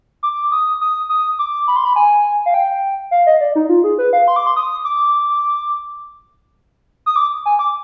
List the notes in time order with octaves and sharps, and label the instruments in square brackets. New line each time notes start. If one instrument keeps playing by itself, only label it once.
[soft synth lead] D6
D#6
D#6
D#6
D6
B5
C6
B5
G#5
F5
G5
F5
D#5
D5
D#4
F4
G#4
B4
F5
C6
D6
C6
D#6
D6
D#6
D6
G#5
D6